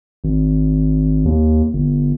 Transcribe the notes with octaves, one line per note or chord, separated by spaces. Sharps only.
G#1
D#2
G1